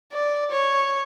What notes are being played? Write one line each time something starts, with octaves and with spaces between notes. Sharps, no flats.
D5
C#5